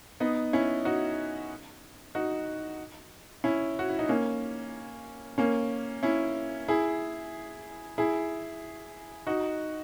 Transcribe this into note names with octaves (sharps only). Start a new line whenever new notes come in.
B3 D#4
C#4 E4
D#4 F#4
D#4 F#4
C#4 E4
F#4
E4
D#4
A#3 C#4
A#3 C#4
C#4 E4
E4 G#4
E4 G#4
D#4 F#4